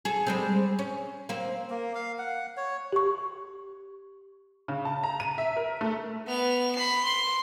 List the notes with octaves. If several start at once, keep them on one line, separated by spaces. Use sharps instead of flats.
G#4 A4
G3 G#3 C4
C#4
A#3 C4
A#3
F5
F#5
C#5
G4 C#6
C#3
A5
A#5
D#7
E5
A#4
A3
B3 F7
B5 C7
C6